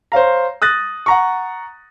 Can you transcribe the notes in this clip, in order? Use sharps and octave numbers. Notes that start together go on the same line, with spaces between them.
C5 C#5 F5 A#5
D#6 F#6 A6 A#6
F#5 A#5 C#6